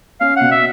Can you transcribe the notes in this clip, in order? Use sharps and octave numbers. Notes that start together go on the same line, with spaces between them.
C#4 F5
B2 F#5
E5